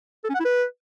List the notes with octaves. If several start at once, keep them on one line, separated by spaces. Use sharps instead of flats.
A4
C#4
F#5
E4
B4